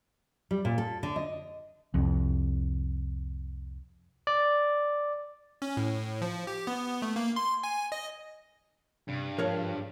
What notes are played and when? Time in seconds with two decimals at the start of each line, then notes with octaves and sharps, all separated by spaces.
0.51 G3
0.65 A#2
0.78 A4
1.03 D3
1.16 D#5
1.94 C2 F2
4.27 D5
5.62 C#4
5.77 A2
6.22 F3
6.47 G4
6.67 B3
7.02 A3
7.16 A#3
7.36 C6
7.63 G#5
7.92 D#5
9.08 G2 C3
9.38 G#2 F3 G#4 A#4 C#5 F5 A5